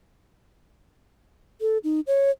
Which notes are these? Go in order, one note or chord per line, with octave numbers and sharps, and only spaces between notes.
A4
D#4
C#5